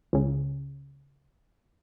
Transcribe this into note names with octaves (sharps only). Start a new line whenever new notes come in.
C#2 C#3